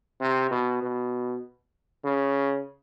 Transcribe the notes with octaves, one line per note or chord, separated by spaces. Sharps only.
C3
B2
B2
C#3